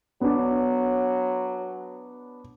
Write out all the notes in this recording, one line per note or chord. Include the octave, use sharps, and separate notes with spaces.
F#3 B3 D4